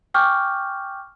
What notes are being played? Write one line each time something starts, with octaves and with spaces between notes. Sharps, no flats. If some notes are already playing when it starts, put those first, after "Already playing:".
G5 G#5 C#6 D6 F6 G6